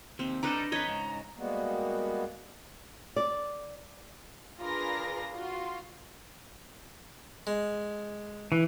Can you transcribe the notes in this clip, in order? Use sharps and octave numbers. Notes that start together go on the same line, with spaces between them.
D#2 C3 C4
G3 D4 D#4 A4 B4 A#5 D6
F2 D#4 B4 C#5 D#5
G#2 C#3
G3 G#3 A#3 B3 F#4
D5
D4 F4 G#4 A#4 B4 A#6
F4 F#4 C6
G#3
E3